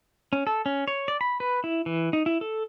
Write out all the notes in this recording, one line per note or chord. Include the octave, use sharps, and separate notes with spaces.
C#4
A4
C#4
C#5
D5
B5
B4
E4
E3
D#4
E4
A4